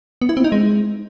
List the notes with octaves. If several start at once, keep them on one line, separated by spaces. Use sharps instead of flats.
B3
E4
C4
D#4
G#3